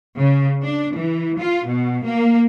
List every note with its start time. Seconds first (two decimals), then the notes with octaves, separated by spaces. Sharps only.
0.18 C#3
0.63 D4
0.94 E3
1.39 F4
1.68 B2
2.05 A#3